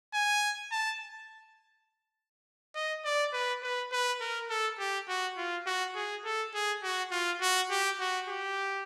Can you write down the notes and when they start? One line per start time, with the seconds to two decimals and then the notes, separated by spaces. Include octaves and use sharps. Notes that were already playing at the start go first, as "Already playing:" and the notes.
0.14 G#5
0.71 A5
2.75 D#5
3.04 D5
3.33 B4
3.63 B4
3.92 B4
4.21 A#4
4.50 A4
4.79 G4
5.08 F#4
5.37 F4
5.66 F#4
5.95 G#4
6.25 A4
6.54 G#4
6.83 F#4
7.11 F4
7.41 F#4
7.70 G4
8.00 F#4
8.28 G4